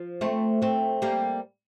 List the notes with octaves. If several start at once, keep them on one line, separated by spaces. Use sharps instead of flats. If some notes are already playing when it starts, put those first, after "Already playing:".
Already playing: F3
A3 C4
A3 C4
G3 A#3